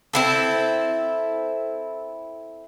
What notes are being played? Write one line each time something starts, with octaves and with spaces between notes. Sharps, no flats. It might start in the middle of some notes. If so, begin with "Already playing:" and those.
C4 E4 A4